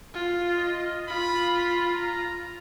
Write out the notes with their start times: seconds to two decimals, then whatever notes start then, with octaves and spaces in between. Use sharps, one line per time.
0.14 F4
0.57 D#5
1.08 F4 B5
1.50 B5
1.95 A#5